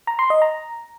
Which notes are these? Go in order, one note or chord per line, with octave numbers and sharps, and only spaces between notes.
A#5
C6
D#5
A#5